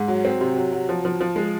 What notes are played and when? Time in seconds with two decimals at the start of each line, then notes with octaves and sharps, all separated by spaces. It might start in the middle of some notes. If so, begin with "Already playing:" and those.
Already playing: G#2
0.08 F#3
0.25 C4
0.41 C3
0.56 F#3
0.73 F#3
0.89 F3
1.05 F3
1.21 F3
1.36 G#3